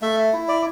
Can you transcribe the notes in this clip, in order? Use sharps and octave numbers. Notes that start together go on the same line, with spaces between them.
A3 E5
E4
D5